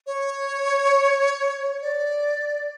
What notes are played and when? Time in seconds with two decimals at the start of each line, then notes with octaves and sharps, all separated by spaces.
0.07 C#5
1.82 D5